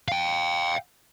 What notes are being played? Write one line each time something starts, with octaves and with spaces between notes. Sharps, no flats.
F5 G5